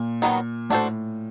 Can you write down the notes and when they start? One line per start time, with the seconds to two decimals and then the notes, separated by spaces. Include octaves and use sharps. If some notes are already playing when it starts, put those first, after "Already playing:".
Already playing: A#2
0.22 D#3 F#3 B3 D#4 F#4
0.70 A2 D4 F#4 A4 C5